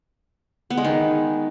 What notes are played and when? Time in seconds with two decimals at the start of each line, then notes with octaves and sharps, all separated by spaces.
0.70 B3
0.77 G#3
0.84 D#3